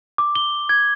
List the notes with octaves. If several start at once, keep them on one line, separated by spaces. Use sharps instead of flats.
D6
G7
G#6